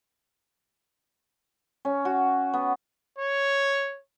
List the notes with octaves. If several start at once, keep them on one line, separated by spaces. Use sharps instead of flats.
C#4
F#4
B3
C#5